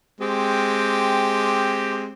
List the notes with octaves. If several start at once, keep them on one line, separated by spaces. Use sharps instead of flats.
G#3 C4 G4